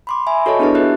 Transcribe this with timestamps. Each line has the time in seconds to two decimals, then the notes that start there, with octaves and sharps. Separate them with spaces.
0.07 B5 C6 D6
0.27 E5 G#5 B5
0.46 F#4 A4 C#5 D#5 A5 C#6
0.59 B3 D4 E4 G#4 B4 A5
0.75 F#4 G4 B4 E5 F#6